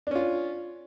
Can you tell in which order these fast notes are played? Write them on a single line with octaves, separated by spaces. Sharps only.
D4 C#4 F4